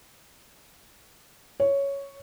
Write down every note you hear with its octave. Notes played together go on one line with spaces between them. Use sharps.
C#5